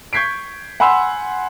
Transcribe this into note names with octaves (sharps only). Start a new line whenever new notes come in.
C#6 G6 G#6 B6 C7 D7
F#5 G#5 B5 C6 E6